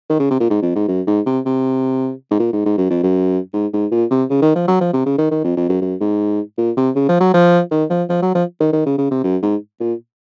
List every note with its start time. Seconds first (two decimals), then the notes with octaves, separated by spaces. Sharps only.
0.10 D#3
0.20 C#3
0.31 C3
0.40 A#2
0.50 G#2
0.62 F2
0.75 G#2
0.88 F#2
1.07 G#2
1.26 C3
1.46 C3
2.31 G#2
2.39 A#2
2.53 G#2
2.66 G#2
2.78 F#2
2.90 F2
3.03 F#2
3.53 G#2
3.73 G#2
3.91 A#2
4.11 C3
4.30 C#3
4.42 D#3
4.56 F3
4.68 F#3
4.81 F3
4.93 C3
5.06 C#3
5.18 D#3
5.31 D#3
5.44 F2
5.57 F2
5.69 F#2
5.82 F#2
6.00 G#2
6.58 A#2
6.77 C3
6.96 C#3
7.09 F3
7.20 F#3
7.34 F3
7.71 D#3
7.90 F3
8.09 F3
8.22 F#3
8.35 F3
8.60 D#3
8.73 D#3
8.86 C#3
8.98 C#3
9.11 C3
9.24 F#2
9.43 G#2
9.80 A#2